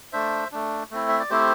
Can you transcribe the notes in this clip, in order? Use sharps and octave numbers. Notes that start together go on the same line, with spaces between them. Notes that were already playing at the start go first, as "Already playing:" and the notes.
A3 D4 C5 E5
A3 D4
A3 C4 E4
E5
D5
A3 C4 E4 G4 C5